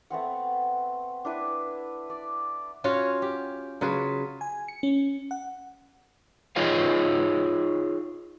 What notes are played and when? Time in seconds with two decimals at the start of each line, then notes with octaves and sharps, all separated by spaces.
0.10 A3 B3 C4 F#5
1.25 D4 E4 B4
2.10 D5
2.84 C#4 F4 F#4 C#5
3.22 G4
3.81 C#3 F#3 F4 B4
4.41 G#5
4.68 C#7
4.83 C#4
5.31 F#5
6.56 D#4 F4 G#4 C#5 D#5 F5